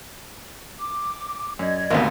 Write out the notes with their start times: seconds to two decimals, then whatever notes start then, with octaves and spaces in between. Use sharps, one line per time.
0.80 D6
1.59 F#2 D5 D#5 G#6
1.90 G#1 D2 C3 A#3 B3